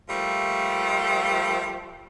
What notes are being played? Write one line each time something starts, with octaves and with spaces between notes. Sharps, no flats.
F3 G3 A3 A#3